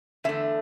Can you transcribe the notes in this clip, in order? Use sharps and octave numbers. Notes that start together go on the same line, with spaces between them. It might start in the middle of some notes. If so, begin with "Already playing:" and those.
E2 D3 A3 E5